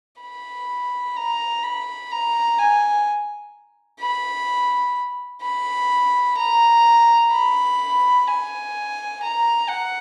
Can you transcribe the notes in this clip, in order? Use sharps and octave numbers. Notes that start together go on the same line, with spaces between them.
B5
A#5
B5
A#5
G#5
B5
B5
A#5
B5
G#5
A#5
F#5